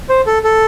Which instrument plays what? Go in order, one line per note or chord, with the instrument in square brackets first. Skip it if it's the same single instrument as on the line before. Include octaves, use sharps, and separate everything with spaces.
[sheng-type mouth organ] C5
A4
A4